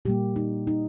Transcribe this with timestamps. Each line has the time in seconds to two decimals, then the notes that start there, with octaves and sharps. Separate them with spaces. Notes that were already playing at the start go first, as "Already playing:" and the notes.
0.05 A#2 G3 A#3 G4
0.36 D#4
0.67 D#4